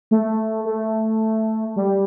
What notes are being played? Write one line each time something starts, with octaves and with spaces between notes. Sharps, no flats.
A3
A3
G3